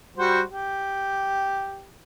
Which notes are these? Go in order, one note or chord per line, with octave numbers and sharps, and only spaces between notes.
G3 F#4 C5
G4